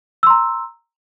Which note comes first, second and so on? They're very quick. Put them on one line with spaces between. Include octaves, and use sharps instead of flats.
E6 C6 A#5